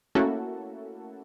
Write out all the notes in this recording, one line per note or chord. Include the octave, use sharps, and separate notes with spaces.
A3 A#3 C#4 E4 F#4 A4